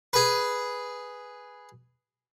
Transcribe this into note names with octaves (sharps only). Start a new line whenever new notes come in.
G#4 B4